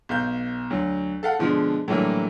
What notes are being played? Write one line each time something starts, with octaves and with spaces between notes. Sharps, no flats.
B1 F5 G6
D2 F#3
A4 F5 F#5
B2 D3 F3 G#3
A2 D3 E3 F#3 G3 A#3